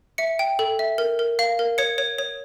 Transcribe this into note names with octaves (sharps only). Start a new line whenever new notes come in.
E5 C#7
G5
A4
E5
A#4
A#4
F5
A#4
C#5 C#7
C#5
C#5